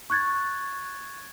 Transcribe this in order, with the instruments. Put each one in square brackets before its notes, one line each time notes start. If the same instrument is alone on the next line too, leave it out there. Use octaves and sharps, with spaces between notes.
[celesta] C#6 F#6 G#6 A6